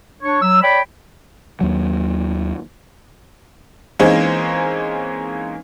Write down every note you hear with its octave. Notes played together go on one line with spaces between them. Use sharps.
D4 C#5 C#6
F#3 E6
C#5 D5 G5 B5
D#2 F#3
E3 G#3 A#3 C4 C#4 D#4